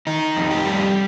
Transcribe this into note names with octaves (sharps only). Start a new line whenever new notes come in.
D#3 D#4
F2
G4
G3